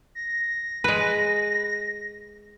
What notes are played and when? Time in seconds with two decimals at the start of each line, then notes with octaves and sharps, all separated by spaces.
0.15 A#6
0.84 G#3 B4